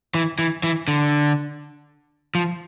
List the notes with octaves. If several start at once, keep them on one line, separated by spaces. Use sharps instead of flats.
E3
E3
E3
D3
F3